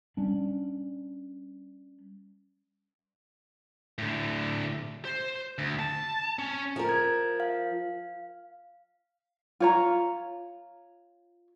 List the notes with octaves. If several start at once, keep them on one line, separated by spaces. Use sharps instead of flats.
G3 C#4 D4
A2 D3
C5
D2
A5
C#4
F3 A#4
G#6
F5
F4 C#5 A#5